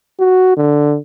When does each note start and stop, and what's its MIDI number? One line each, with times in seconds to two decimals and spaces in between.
0.20 0.52 66
0.57 0.97 50